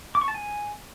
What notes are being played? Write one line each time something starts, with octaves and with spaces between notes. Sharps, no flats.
D6
C#6
A5
G#5